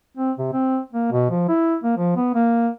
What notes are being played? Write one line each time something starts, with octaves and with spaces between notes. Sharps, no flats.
C4
C3
C4
A#3
B2
F3
E4
A#3
F3
B3
A#3